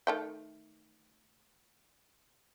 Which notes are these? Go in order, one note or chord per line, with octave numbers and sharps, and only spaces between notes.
D#3 A3 G5